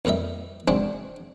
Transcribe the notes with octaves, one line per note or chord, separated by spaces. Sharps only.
F2 A#2 G3 D#5 E5
G#3 C4 D4 F#4